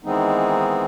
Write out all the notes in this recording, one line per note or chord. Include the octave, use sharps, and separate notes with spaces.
D#3 E3 G#3 B3 C4 D#4